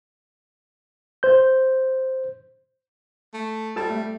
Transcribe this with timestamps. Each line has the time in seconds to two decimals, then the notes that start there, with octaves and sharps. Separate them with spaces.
1.23 C5 G6
3.34 A3
3.76 G3 A4 A5
3.90 A3